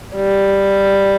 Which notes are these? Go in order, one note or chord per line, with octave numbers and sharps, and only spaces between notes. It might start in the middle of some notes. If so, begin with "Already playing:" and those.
G3